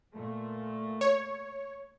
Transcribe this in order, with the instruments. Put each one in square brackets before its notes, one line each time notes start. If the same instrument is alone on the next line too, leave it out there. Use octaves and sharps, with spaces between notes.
[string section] A#2 A3
[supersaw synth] C#5